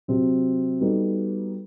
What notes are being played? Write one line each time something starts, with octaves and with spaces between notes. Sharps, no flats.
C3 F#3 C4
G3 B3 D#4 F#4 A4